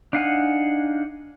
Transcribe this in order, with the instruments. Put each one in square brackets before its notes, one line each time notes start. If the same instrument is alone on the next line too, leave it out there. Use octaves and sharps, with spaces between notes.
[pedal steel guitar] D4 D#4 F5 F#5 G#5